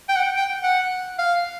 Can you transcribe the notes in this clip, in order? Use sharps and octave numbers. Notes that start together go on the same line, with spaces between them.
G5
F#5
G5
G5
F#5
F5